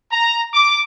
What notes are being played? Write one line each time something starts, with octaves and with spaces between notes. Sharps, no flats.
A#5
D6